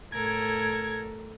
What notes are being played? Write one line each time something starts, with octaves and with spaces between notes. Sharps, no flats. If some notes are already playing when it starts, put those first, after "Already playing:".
A2 A4 A#4 G#6